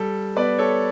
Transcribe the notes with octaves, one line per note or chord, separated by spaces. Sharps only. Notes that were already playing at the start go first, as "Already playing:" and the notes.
Already playing: G3 A4
B3 B4 D5
A4 C#5